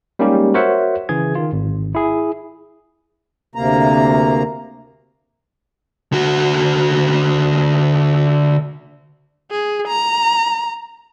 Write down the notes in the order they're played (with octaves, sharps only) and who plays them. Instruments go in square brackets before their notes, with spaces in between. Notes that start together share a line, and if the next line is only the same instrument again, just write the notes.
[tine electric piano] G3 G#3 A#3 C#4 D#4 G4
F#4 A#4 C5 C#5 E5 F#5
C#3 E3 G#4 G#6
D#3 F4
G#1
E4 G#4
[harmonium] D2 C3 A#3 A#5
[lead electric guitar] D3 F#4
[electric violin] G#4
A#5